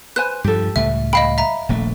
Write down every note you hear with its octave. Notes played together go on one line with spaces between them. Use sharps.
B4 C5 G#5 F#6
G2 F3 G4 A4
C#2 A2 G3 E5
D#5 F5 G5 B5
E5 A#5
D#1 A#1 A3